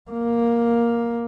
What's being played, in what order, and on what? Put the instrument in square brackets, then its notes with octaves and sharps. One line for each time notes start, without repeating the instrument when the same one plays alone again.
[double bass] A#3